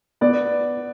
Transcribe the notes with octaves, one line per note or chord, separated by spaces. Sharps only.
B3 D5